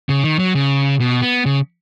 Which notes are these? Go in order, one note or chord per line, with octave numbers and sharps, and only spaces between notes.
C#3
D#3
F#3
C#3
B2
B3
C#3